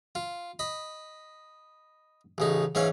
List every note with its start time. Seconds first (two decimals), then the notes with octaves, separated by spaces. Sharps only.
0.15 F4
0.59 D#5 B5
2.38 A1 C#3 D#4
2.75 G#2 E3 C#4 C#5 F5 C#6